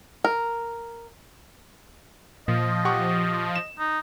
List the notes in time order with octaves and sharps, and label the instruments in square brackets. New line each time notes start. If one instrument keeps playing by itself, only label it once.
[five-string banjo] A#4
[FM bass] A#2 [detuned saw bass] F3 [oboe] D#5
[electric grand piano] G4 F#5 C#6
E7
[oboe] D#4